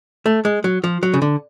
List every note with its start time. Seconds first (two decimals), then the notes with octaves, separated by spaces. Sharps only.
0.26 A3
0.45 G#3
0.64 F#3
0.84 F3
1.03 F#3
1.14 C#3
1.22 D3